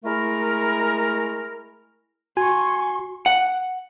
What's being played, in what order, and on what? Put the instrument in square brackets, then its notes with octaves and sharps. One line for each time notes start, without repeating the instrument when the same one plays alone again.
[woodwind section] G#3 A3 E4 A#4
[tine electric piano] F#4 [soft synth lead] G#5 [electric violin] C6 C#6
[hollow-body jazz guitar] F#5